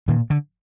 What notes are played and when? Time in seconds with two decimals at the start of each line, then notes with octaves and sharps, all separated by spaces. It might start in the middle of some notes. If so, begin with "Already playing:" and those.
0.08 A#2 D#3
0.30 D3